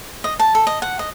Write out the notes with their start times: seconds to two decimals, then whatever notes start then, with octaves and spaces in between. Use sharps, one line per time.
0.24 D#5
0.39 A5
0.55 A4
0.67 D#5
0.82 F#5
0.99 D#5